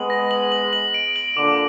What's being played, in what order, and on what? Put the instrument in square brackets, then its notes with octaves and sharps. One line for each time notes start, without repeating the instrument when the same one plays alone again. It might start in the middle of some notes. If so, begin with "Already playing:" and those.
Already playing: [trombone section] G#3 B3 [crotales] F#7
[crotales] A#6
F#7
F#7
F#7
D7
F#7
[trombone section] A#2 D3 [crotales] D6